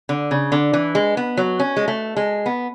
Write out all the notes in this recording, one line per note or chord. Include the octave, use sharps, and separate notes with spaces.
D3
C#3
D3
E3
G#3
B3
F#3
C#4
G#3
A3
G#3
B3